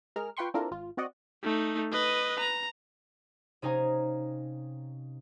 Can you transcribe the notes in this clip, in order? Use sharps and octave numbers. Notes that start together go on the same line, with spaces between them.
G#3 G#4 A#4 F6
F4 B4 G5 C6 C#6
C4 D4 E4 F4 A4 A#4
G#1 F4
C4 F#4 D5 D#5 F#5
A3 D#4
B4 D#5
A#5
C3 C#4 D#4 F5 G#5 A#5